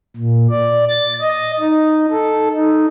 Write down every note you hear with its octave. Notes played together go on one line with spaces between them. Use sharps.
A#2
D5
A6
D#5
D#4
A4
D#4